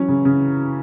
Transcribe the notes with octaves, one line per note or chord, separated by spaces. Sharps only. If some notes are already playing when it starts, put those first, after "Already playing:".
Already playing: E3 F#3 C#4
C#3
C#3